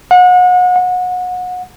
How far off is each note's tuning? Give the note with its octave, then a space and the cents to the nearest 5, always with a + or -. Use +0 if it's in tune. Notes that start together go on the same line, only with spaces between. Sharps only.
F#5 -35
F#5 -30